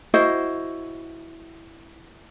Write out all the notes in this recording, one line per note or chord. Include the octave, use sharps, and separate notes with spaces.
E4 F#4 C5 D#5